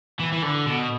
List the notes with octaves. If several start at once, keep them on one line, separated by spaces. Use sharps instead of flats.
E3
E3
D3
B2